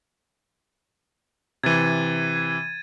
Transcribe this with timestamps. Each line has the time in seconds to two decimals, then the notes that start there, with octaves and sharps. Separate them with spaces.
1.63 C3 E3 G#6 A6 D#7